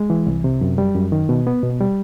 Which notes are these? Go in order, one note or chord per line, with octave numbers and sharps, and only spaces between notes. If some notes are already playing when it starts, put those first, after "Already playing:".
Already playing: G#3
E3
C2
C3
F#2
G3
F#2
D#3
B2
B3
B2
G3